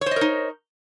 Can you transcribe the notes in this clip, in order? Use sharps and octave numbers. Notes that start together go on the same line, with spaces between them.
D#4 A#4 C5 C#5 D#5